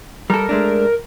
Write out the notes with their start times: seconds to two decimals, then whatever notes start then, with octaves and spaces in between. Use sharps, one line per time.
0.30 G3 A4 A#4
0.49 G#3 A3 D4